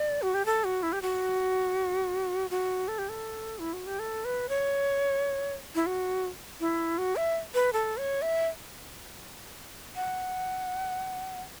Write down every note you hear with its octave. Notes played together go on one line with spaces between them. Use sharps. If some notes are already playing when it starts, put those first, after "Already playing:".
Already playing: D5
F#4
G4
A4
F#4
E4
G4
F#4
F#4
A4
G4
A4
E4
F#4
G4
A4
B4
C#5
E4
F#4
E4
F#4
E5
B4
A4
C#5
E5
F#5